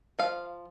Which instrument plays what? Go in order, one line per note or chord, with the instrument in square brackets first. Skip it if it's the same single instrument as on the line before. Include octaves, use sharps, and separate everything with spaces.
[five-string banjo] F3 F5